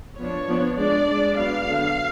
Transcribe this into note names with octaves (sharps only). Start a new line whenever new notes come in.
F3 B3 D4 C#5
F3 B3 D4
G#3 D4 D5
G#3 D4
F#3 B3 D4 F5
D3 F#3 B3 D4